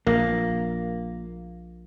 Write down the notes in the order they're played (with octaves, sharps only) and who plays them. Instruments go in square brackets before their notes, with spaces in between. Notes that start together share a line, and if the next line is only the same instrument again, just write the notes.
[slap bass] A#1 [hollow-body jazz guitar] A#3